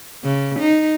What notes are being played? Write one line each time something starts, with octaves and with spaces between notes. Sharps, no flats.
C#3
D#4